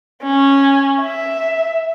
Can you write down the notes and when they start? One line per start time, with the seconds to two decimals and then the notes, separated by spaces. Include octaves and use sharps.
0.23 C#4
1.02 E5